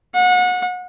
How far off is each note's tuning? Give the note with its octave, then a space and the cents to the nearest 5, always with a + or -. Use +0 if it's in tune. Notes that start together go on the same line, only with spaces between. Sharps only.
F#5 -30